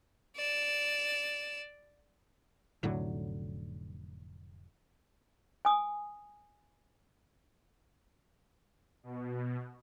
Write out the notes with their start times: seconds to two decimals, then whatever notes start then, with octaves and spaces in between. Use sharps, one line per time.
0.36 D5 E7
2.83 F1 A2 D3 F#3
5.65 G#5 D#6
9.03 B2